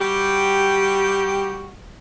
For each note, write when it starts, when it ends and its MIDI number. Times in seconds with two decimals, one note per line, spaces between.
0.01 1.72 55
0.01 1.72 66
0.01 1.72 67